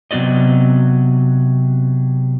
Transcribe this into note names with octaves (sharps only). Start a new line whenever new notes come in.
C3 F#3 B3 F#4 D5 D#5